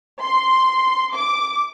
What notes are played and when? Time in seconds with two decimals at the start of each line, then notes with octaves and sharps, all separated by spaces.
0.22 C6
1.15 D6